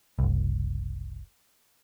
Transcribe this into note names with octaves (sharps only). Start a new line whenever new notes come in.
F#1 C2